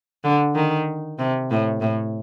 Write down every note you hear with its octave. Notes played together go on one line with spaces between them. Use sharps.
D3
D#3
C3
A2
A2